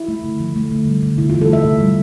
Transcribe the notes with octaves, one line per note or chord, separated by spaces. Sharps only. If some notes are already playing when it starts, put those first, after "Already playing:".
Already playing: E4
A3
D3
F3
A3
D3
G3
D3
C3 E4
E3 F4
A4
A3 E5
C3
G3